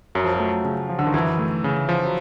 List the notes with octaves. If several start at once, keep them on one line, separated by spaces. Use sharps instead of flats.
F#2 F#3
F3
F#3
A3
C#3
F3
D3
D#3
F#2 E3
A3
C#3
F3
F#3